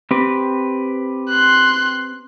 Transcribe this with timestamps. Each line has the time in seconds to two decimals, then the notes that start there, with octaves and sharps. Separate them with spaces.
0.11 C4 G4 B4
1.30 C6 F#6